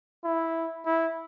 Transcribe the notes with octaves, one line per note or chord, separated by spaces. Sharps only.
E4
E4